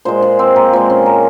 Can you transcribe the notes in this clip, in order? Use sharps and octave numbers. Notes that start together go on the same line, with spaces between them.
A#2 G#3 C5
G#4
C4
A#3
A#2 G#3 C4
C#4
A#4